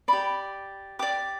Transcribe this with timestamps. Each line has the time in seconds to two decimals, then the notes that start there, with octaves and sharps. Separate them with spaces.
0.08 G4 D5 B5
0.99 G4 D5 D6